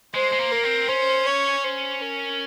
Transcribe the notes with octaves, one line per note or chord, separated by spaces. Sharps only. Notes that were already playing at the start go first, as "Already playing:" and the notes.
G#3 C5
G#3
A#3
A#4
C4
C#4 C5
C#5
C5
A#4